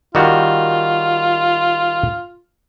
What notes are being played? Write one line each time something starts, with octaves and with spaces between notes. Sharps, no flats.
D#3 G3 F4 F#4